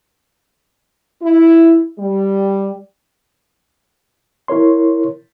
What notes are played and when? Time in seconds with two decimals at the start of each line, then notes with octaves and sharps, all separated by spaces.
1.23 E4
1.99 G3
4.48 E4 A#4 C#5 C6